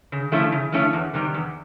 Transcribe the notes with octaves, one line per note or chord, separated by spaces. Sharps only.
C#3
F3 A3 C#4 E4
C#3
F3 A3 C#4 E4
E2
C3 D#3 G3
E2